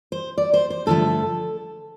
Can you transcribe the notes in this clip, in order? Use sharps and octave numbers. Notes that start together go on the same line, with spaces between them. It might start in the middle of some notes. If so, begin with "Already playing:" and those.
C5
D5
C5
C5
G2 D3 F3 A3 A4